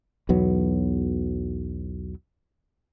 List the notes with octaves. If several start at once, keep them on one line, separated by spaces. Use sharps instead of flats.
B1 E2 F#3 B3